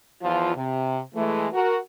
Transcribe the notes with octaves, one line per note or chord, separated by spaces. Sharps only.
E2 F3 F4
C3
E3 G#3 A3
F#4 A#4